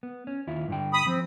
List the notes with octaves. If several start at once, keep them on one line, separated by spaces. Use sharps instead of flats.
B3
C#4
D#2 E4 F4
G2 D3 G5
B5 D#6
F3 C4